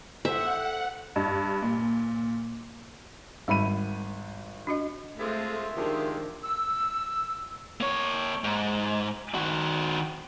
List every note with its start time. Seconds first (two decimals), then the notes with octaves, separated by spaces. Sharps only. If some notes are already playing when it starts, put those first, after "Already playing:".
0.25 A4 C5 E5 F#5 G5
1.16 G2
1.62 A#2
3.48 G#1 G3 E5 B5 D#7
4.67 D4 F#4 D#5
5.19 G#3 A3 C4 F4 C5 E5
5.76 D#3 F3 G#3 D4 G4 F5
6.43 E6
7.81 A#3 C#5
8.44 G#2
9.35 D#3 F#4